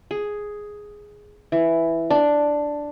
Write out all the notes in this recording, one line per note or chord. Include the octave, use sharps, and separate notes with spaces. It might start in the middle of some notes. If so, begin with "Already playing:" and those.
G#4
E3
D4